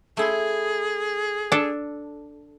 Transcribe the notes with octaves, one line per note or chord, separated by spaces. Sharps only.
A3 E4 G#4 C6
D4 A4